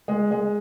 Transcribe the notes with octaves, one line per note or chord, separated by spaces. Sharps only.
G#3
G#3